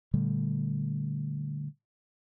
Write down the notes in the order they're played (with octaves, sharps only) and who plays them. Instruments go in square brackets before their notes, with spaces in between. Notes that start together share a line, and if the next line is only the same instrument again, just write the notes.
[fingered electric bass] A#2 D3 G3 A3